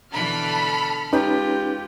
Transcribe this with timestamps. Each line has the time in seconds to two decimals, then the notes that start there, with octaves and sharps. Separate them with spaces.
0.12 B2 D3 E3 A4 B5 F6
1.13 G#3 C#4 D#4 F4 G4 B4